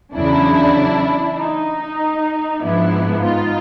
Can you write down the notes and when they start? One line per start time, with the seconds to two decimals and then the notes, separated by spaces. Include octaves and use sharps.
0.14 E2 C#3 F#3 D4 E4
1.38 D#4
2.60 G#2 F3 G#3 B3 D4 E4
3.22 D#4 F4